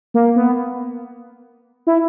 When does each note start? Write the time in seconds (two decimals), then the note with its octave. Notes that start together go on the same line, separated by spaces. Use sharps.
0.14 A#3
0.36 B3
1.87 E4